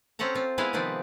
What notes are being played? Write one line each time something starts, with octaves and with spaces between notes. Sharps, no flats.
C4 C#4 A4 F#5 A#5
C4 F4
G#3 B3 E4 G#4 C5 F5
C3 D#3 F3 B3 C4 D5